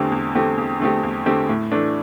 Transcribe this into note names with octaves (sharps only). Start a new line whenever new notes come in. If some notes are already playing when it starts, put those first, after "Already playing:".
Already playing: E2 D3 A3 C4 G4
E2
D3 A3 C4 G4
E2
D3 A3 C4 G4
E2
D3 A3 C4 G4
A2
E3 A3 D4